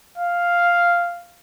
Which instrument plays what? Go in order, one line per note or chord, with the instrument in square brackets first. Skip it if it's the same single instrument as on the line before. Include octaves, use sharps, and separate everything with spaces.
[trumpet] F5